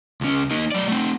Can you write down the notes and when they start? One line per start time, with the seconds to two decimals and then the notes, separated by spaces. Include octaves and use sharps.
0.21 C#2 C#4
0.51 A#3 D#4
0.72 F#3 D5
0.88 A3 C4